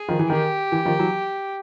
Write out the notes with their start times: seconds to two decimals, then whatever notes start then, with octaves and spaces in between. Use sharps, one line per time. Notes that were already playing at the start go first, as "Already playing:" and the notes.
Already playing: G#4
0.08 D#3 F3
0.19 E3
0.30 D#3 G4
0.72 E3
0.85 D#3 F3
0.99 E3 F#3